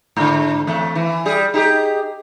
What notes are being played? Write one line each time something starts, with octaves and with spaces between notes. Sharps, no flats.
G#2 D3
E2 A3
E3
G3 G#4
D#4 G4 G#4